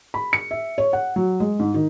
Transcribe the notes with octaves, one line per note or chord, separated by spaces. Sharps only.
B5
C#7
E5
C#5
F#5
F#3
G#3
G#2
D#3